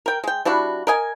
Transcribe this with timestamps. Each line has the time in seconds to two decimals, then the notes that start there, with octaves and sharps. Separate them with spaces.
0.06 A#4 G5
0.24 G#3 G5
0.45 G3 D4 E4 F#4
0.87 A#4 D#5 G#5